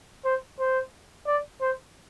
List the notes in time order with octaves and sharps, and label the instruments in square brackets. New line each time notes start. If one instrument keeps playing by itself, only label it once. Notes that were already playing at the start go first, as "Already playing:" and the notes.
[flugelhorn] C5
C5
D5
C5